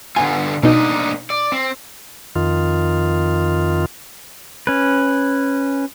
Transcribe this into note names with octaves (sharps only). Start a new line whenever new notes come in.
D3 B3 F4 G#5
B2 A#3 D4 D#4 D#5
D5
C4
F2 D#3 F4
C#4 B4